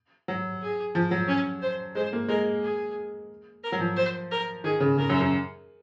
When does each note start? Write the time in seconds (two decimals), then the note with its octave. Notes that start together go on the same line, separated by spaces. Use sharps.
0.28 F#3
0.62 G#4
0.95 F3
1.11 F#3
1.28 C#4
1.62 C5
1.95 G#3 C5
2.13 A#3
2.29 G#3 A#4
2.63 G#4
3.63 A#4
3.72 F#3
3.80 F3
3.97 C5
4.31 A#4
4.64 D#3 G#4
4.80 C#3
4.98 C#3 A#4
5.10 F#2
5.20 F#2